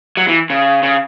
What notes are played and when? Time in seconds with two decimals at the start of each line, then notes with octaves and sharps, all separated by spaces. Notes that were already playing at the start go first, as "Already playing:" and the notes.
0.17 F#3
0.28 E3
0.50 C#3
0.83 C#3